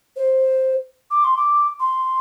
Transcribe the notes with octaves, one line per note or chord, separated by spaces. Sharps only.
C5
D6
C6
D6
C6